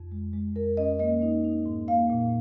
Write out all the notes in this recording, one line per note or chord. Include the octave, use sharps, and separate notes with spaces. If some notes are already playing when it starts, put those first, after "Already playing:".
Already playing: F2
G#3
G#3
F2 A#4
C#4 D#5
A#3 D#5
D#4
D#4
G#2
A#3 F5
A#2